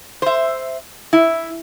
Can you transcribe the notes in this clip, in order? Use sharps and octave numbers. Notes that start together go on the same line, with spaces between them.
C5 E5
E4